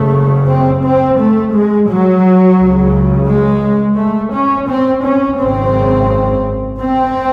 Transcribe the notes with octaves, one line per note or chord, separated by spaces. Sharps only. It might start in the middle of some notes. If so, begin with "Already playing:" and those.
Already playing: F#1 F#2 C#3 A3
C4
C4
A3
G#3
F#3
C#2 C#3
G#3
A3
C#4
C4
C#4
G#1 F#2 C#3 C4
C4